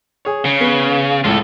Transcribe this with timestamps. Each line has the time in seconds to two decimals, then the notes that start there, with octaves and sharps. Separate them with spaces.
0.25 G#4 C#5
0.45 C#3
0.61 B3
1.24 C#2 A2 F4 A4